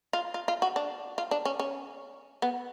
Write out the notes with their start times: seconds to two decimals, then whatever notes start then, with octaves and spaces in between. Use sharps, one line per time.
0.13 F4
0.34 F4
0.48 F4
0.62 F#4
0.76 D4
1.18 F4
1.31 D4
1.45 C#4
1.59 C#4
2.42 B3